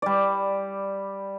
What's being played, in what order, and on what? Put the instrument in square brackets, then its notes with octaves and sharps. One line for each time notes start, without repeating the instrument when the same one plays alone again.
[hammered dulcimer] G3 D5